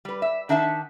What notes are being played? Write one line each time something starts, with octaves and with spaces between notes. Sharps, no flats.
G3 B4
E5
D#3 D4 E5 F#5 A5